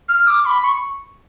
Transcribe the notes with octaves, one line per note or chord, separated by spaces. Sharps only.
F6
D6
B5
C#6